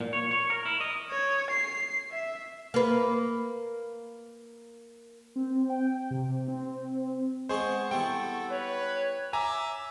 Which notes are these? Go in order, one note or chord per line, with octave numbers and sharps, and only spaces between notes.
A#2
C#5
C#5
A#4
E4
D#5
C#5
C7
E5
A#3 B4
C4
G5
C3
C4
G#3 B3 C4 G#4 C5 C#6
G3 B3 E4 A4 G5
B4 C#5
E5 G#5 A#5 D6